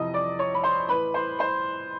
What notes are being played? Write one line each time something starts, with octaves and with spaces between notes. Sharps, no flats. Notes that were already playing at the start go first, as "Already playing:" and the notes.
Already playing: F2 C3 E3 D#5 D#6
D5 D6
C#5 C#6
B5
C5 C6
A2 E3 B4 B5
C5 C6
C5 C6